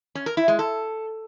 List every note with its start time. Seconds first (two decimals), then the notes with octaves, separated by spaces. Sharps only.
0.15 C#4
0.26 A#4
0.37 E4
0.48 G#3
0.59 A4